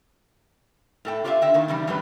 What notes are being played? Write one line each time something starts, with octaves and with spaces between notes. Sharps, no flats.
A2 A4 G5
F4 G4 B4 D5 E5 F5
D3 D#5 E5 G5
A#2 D#3 A#3
C#3 E3 G3 D#4
F#2 A2 F#3 G3 G4 B4